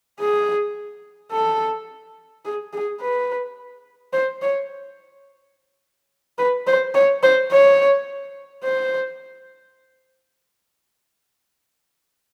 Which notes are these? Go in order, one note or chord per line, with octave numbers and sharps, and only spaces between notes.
G#4
A4
G#4
G#4
B4
C5
C#5
B4
C5
C#5
C5
C#5
C5